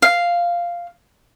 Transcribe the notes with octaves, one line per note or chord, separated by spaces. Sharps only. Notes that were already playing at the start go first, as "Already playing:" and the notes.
F5